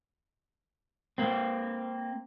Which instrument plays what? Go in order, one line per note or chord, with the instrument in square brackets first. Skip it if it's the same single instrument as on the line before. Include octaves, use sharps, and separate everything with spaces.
[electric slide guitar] A#3 C4